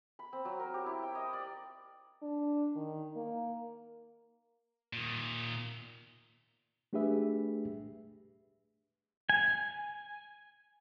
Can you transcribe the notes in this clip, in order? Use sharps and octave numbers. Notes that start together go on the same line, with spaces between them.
B5
C4
F#3
A#4
G4
E4
G5
D#5
D5
D4
D#3
A#3
A#2 D#3
A3 D4 G4 G#4 B4 E5
G#5